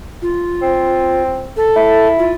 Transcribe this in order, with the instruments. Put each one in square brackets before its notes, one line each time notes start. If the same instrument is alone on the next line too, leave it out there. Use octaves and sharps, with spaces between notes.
[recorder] F4
[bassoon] C4
[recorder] A4
[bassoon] E4
[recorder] F4